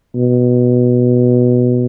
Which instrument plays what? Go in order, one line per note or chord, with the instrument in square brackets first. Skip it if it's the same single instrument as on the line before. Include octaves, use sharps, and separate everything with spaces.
[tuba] B2